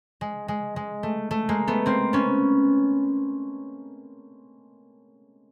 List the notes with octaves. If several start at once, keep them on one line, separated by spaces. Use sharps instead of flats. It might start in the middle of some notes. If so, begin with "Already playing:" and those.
G#3
G#3
G#3
A3
A3
G#3 A#3
A3 B3
A#3 C4
B3 C#4